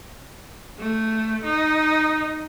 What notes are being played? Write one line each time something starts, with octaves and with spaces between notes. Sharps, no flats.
A3
D#4